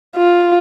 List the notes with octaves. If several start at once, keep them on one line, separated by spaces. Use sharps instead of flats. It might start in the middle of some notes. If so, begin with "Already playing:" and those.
F4